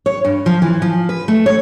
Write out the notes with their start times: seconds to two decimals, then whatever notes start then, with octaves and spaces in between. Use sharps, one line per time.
0.06 C#5
0.25 G2
0.46 F3
0.62 E3
0.82 F3
1.09 B4
1.28 A3
1.46 C#5